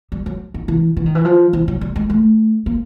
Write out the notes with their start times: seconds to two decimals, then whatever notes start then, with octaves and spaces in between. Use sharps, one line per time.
0.12 G3
0.26 F#3
0.54 D#3
0.68 E3
0.97 E3
1.06 D#3
1.15 E3
1.25 F3
1.53 E3
1.68 F#3
1.81 G3
1.96 G#3
2.10 A3
2.66 A#3